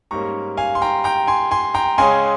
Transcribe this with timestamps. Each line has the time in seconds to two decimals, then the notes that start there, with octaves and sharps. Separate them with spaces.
0.11 G#2 G3 A#3 C#4 A#5 C#6
0.57 F5 G#5
0.75 C6
0.82 G5 A#5
1.04 G5 A#5
1.27 G#5 C6
1.51 G#5 C6
1.74 G5 A#5
1.98 C#2 C#3 G#3 C#4 G#5 C6